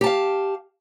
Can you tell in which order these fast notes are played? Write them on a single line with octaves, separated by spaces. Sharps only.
G4 A5 F5